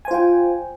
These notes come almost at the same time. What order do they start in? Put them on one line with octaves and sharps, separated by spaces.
G#5 C5 F4 G5